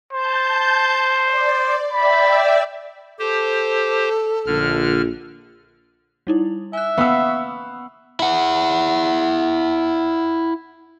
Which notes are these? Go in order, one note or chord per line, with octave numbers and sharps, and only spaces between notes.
C5 A5 G6
D5
D5 E5 G5 B5
G4 A4 C5
A#1 D3 F6
G3 D#4 E4
E5 G#5 F#6
B3 F5 F#5 C#6 D#6 E6
E4 F#5